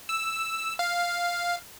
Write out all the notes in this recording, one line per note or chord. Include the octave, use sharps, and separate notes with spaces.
E6
F5